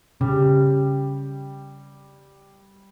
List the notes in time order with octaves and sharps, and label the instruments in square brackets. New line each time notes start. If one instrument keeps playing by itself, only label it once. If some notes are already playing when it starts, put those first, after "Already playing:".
[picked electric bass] C#3 [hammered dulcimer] G3